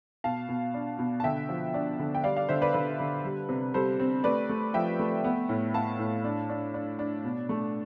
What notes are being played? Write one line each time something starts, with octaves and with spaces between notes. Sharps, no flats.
B2 F5 A5
B2
D4
B2
A5
D3 E5 G5
F3
D4
D3
G5
G3 D5 F5
D5 F5
D3 C5 E5
B4 D5
D3 B4
D3
G3
C3
G3 A4 C5
C4
A3 B4 D5
A3
F3 E5 G5
A3
B3
A2
B3 F5 A5
A2
D4
D4
D4
D4
B2
A3